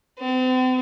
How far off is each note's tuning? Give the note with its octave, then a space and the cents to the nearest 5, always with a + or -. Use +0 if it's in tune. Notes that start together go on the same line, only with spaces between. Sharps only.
C4 -40